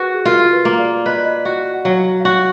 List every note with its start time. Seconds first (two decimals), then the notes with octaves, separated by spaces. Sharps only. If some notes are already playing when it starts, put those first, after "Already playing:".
Already playing: F#4 G#4 A#4 B4
0.14 G#4
0.25 F4 A#4
0.53 B4
0.65 A#3
0.78 D5
1.06 B4 D#5
1.15 D5
1.25 D#5
1.45 F#4 F5
1.74 F#5
1.85 F#3 F5
2.20 F5
2.25 F#4 F#5